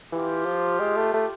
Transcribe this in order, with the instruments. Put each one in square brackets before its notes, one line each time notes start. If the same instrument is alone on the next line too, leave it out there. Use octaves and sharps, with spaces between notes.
[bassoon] E3 [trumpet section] F4 G4
[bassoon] F3
G#3
A3
A3